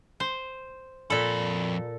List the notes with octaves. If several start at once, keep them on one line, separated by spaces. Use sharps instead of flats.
C5
F2 A#2 A4 B5